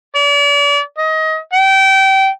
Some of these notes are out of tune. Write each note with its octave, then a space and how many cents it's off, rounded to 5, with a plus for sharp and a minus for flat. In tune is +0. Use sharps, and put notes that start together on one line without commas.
D5 -40
D#5 +25
G5 -25